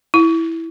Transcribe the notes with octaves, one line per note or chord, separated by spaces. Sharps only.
E4